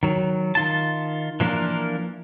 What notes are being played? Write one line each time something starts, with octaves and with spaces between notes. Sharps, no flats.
D#3 F#3
D#3 F4 A5
E3 F3 A#3 D4 A#4